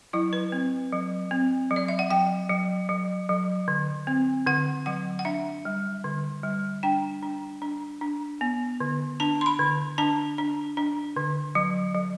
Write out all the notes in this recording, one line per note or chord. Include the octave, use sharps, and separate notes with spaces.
F#3 E4
B4
C4
F#3
C4
F#3
D5
E5
F#5
F#3 G5
F#3
F#3
F#3
D3
C4
D3 F#5
F#3 F#5
F#5
D4 E5
G3
D3
G3
D4 G5
D4
D4
D4
B3
D3
D4 A5
C6
B5
D3
D4 A5
D4
D4
D3
F#3
F#3